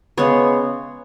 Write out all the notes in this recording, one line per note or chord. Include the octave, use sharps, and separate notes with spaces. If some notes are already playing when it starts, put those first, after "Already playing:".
C#3 G#3 B3 C#5